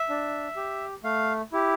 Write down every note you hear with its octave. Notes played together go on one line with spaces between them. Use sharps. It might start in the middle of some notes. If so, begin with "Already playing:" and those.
Already playing: E5
D4
G4
A3 F5
E4 G4